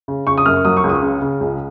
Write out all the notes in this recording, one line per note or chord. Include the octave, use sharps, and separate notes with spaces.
C#3
C#3 C#6
D#6
F#2 F6
F#3 D#6
C#6
C#2
D#6
C#3
C#3
C#2